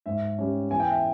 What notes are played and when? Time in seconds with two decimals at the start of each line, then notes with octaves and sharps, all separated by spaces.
0.06 G#2 E5
0.38 G3 C#4
0.71 E2 G#5
0.80 G5
0.90 E5